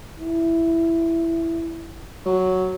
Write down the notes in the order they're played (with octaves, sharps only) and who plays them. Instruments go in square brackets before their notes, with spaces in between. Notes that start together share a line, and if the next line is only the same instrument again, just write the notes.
[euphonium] E4
[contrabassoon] F#3